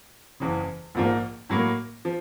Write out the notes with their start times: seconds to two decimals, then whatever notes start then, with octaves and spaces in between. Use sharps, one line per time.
0.40 F#1 E2 C#3
0.95 A#1 G#2 F3 A#3
1.49 A2 F#3 A#3
2.05 F3